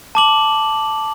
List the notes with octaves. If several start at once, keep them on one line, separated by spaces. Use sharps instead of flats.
A5 D6 F#7